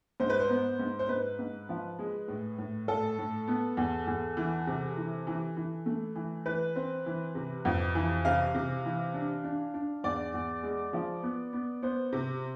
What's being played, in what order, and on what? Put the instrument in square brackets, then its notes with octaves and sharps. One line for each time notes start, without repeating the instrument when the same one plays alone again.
[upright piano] G#2 C5
B4
C5
B3
G#2
C5
G#2 B4
G#2
F3
G#3
A2
A2
A2 A4
A2
B3
E2
E2
E3
C3
E3
E3
E3
A3
E3
E3 B4
C4
E3
C3
F2
E3
C3 F5
C3
E3
D4
D4
D4
E2 D5
E2
G#3
F3
B3
B3
B3 C5
C3